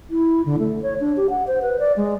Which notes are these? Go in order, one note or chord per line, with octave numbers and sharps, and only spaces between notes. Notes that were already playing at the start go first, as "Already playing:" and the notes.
E4
D3
A3
C#5
D4
G4
F#5
C5
B4
D5
G#3